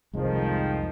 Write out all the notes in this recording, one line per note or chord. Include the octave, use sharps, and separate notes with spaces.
C2 F2 D#3 F3 G#3